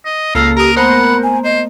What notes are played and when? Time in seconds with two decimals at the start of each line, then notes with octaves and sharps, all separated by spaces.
0.05 D#5
0.35 C#2 A#3 A4 F5 E6 F6 A#6
0.57 G4 A#4 A#5 D#6
0.76 A3 B3 A#4 C5 F#5 B5
1.23 G#5
1.44 C5 D#5